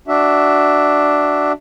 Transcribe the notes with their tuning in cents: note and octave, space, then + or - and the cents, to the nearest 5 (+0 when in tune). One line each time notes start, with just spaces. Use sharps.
D4 +0 F#4 +15 E5 +0